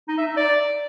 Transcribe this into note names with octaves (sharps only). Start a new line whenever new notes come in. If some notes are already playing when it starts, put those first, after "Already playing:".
D#4
E5
D#4
D5